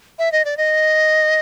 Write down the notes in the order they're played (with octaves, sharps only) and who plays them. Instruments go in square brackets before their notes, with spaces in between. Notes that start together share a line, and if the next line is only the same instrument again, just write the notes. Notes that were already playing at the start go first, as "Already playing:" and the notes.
[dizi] E5
D#5
D5
D#5